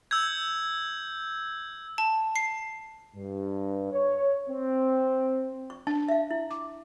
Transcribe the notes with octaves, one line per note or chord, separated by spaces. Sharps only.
E6 G6 G#6
A5
C7
G2
C#5
C4
C#6
D4 A5
E5 F5
E4
D6